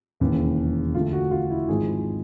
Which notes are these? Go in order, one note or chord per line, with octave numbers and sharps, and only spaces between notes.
E1 D#2 C#3 E3
D2 D3 F3 A3 F4
F#4
F4
E4
G#1 G#2 F3 G#3 G#4